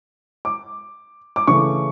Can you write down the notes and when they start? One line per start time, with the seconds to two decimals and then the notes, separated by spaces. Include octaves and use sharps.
0.45 D6
1.36 D6
1.47 C#3 E3 A3 C#6